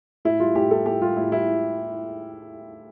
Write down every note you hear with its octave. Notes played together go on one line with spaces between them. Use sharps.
A2 E4
G3 F4
A2 G4
G3 A4
A2 G4
G3 F4
A2 E4
G3 E4